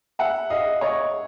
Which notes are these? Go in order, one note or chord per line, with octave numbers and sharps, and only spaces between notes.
E5 F#5
D#5 F5
C#5 D#5